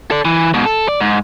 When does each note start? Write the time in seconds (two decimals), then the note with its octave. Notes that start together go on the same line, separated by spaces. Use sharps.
0.11 A4 D5
0.25 E3
0.54 G#2 B2
0.65 A4
0.88 D5
1.01 G#2